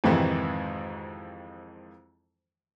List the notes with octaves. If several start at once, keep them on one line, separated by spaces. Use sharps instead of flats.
F2 G#2 C3 D#3 E3 G#3